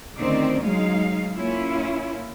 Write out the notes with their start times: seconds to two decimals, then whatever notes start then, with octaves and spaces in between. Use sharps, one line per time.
0.18 D2 D#3 C4 C#4 D#4 D5
0.62 F#3 G#3 D#4 F5
1.35 A#3 C#4 E4 F4